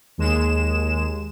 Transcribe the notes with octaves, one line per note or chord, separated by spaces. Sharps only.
D#2 G#3 E7